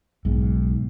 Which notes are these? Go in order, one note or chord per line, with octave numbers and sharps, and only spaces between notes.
B1 G#2